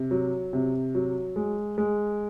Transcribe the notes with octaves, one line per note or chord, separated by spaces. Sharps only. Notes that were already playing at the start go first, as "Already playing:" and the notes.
Already playing: C3
F#3
C3
F#3
G#3
G#3